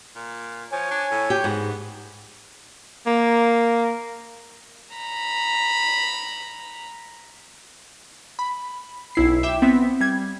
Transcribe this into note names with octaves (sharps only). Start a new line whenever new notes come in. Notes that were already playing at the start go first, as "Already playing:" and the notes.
A#2
F3 C#5 G#5
D4
A2
G4
G#2 B3
A#3
A#5 B5
B5
B1 E4 C7
E5 G5 D6 E7
B3 C4 E5 B6
G3 G#6